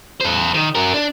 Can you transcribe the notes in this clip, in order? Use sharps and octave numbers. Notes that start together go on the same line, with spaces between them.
A4 C5
D#3
F#4 A#4
D4